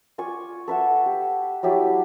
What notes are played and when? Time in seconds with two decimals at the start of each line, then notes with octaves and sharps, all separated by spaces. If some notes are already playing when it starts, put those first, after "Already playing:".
0.18 F4 D5 G#5 C#6
0.68 A4 B4 E5 F#5
1.06 G4
1.63 F#3 E4 G4 D5